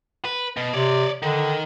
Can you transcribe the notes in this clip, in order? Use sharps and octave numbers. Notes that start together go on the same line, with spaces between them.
B4
B2
C3 C#5 D5
D3 D#3